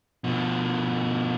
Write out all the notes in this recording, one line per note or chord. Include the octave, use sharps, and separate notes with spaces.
B2 F3